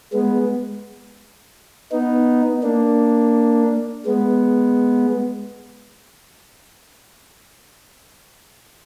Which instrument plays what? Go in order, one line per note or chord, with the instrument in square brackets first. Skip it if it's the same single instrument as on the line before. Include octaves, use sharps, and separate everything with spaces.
[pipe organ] G#3 B3
B3 D#4
A#3 D4
G#3 B3